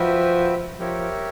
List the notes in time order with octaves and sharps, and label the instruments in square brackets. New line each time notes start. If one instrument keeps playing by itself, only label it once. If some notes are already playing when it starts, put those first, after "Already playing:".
Already playing: [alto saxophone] F3 [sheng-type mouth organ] F#4 B4 E5 G5
[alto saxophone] F3 [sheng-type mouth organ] G4 A#4 C#5 E5